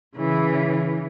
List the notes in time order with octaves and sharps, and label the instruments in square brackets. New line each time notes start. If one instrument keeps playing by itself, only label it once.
[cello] C#3 E3